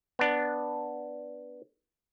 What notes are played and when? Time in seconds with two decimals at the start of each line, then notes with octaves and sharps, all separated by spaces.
0.19 B3 D4